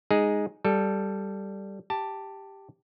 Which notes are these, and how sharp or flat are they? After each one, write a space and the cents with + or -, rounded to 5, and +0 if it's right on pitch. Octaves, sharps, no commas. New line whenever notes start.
G#3 +0 D#4 +0 G#4 +0
G3 +0 A4 +0
G4 +0 A5 +10